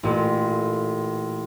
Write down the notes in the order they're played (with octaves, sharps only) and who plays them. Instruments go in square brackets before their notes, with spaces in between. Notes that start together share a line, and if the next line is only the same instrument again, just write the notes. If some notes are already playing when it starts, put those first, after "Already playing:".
[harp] A1 A#2